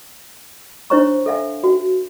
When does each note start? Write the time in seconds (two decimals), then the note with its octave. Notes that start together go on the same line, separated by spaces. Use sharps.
0.90 D4 E4 C5 C#5 A#5 C#6
1.26 A4 E5 F5 G#5
1.64 F#4